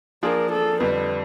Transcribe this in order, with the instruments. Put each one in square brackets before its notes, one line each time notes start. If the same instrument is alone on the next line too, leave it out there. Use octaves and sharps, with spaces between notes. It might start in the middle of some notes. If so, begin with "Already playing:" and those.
[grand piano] F3 A#3 D4 F4 G#4 [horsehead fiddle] A#4
[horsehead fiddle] A4
[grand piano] F2 D3 G3 [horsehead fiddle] B4